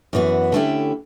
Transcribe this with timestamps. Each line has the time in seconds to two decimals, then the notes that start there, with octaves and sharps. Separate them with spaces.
0.13 F#2 E3 B3 F#4
0.52 D3 A3 C#4 E4 G4